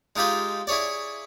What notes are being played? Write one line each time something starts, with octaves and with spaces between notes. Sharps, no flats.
G#3 D#4 F4 G4 G#4
E4 G#4 C#5 D5